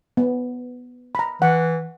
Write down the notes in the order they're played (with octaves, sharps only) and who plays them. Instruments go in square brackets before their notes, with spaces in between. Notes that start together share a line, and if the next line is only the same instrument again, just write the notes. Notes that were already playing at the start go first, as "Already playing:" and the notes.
[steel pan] B3
A#5 B5
[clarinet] E3 [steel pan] F#5